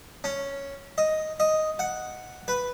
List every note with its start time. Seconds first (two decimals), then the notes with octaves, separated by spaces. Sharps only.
0.24 C#4
0.98 D#5
1.40 D#5
1.79 F#5
2.48 B4